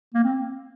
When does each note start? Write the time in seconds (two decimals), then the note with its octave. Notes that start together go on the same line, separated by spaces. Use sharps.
0.14 A#3
0.24 C4